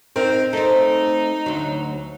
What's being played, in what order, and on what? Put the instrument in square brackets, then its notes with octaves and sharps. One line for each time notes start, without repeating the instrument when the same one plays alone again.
[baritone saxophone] C4 [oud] D#4 A#4
[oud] A3 C4 [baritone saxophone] D#4
[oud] D2 F#3